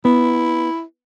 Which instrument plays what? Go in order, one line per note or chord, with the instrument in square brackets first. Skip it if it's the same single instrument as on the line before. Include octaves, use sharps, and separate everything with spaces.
[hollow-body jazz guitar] B3 [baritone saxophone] E4